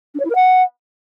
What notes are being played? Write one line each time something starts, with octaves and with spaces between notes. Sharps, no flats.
D4
C#5
E4
A#4
F#5